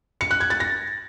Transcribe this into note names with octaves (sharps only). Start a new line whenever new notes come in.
C#7
F#6
G#6
A6
A#6